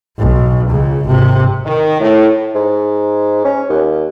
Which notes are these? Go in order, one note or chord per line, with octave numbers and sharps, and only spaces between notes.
B1
C#2 C#3
G#1 C3
D#3
A2
G#2
C#4
D#2